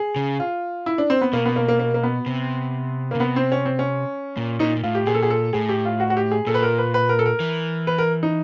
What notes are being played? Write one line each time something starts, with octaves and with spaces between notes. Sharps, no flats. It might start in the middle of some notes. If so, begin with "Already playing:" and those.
Already playing: G#4
C#3
F4
E4
D4
C4
B3
B2 A#3
B3
A#3
A#3
A#3
A#3
B3
C3
A#3
C#3
C3 B3
C4
C#4
C4
C#4
A#2
A#2 D#4
A#2
A2 F4
G4
A#2 G#4
A4
G#4
A4
A2 G#4
G4
F4
F#4
F#4
G4
G#4
A#2 A4
B4
A#4
B4
B4
A#4
A4
A#4
E3
B4
A#4
D#4